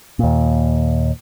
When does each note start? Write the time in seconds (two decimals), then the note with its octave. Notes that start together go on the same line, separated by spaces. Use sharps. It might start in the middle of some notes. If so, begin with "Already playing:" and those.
0.19 D#2 A#2